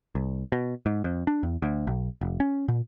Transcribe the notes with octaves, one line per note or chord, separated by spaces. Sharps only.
C2
B2
G#2
F2
D4
E2
D2
B1
F1
C#4
A#2